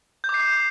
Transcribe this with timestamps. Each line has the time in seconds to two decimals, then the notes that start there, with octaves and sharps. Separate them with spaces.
0.24 G6
0.29 D6
0.34 C7